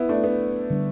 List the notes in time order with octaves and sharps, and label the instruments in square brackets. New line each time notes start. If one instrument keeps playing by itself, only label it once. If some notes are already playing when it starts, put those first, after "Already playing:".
Already playing: [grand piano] B3 E4
A3 D4
B3
[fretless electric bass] D3 G3 D4